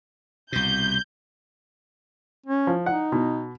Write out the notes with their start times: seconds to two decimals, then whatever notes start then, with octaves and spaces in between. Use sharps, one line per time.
0.52 C2 B2 G6
2.46 C#4
2.67 F3
2.86 D#4 F#5
3.12 B2